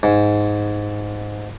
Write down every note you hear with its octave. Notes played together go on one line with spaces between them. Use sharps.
G#2